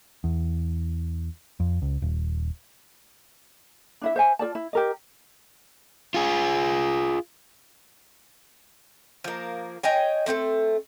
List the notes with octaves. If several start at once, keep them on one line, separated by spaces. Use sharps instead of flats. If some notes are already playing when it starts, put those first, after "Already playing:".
E2
F2
C#2
D#1
D4 E4 E5
C5 E5 G#5
F4 G#4 D5 A5
E4
G4 A#4 D#5
F4 G#4
F3 A#3
C#5 D#5 G5 G#5
A3 C4 F#4 A4